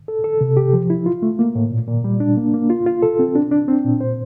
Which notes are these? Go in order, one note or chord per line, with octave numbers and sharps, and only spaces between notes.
A4
A4
C3
G4
F3
E4
F4
A3
A#3
A2
A#2
A#2
G3
D4
A#3
A#3
F4
F4
A4
C4
D4
D4
C4
A#2
C5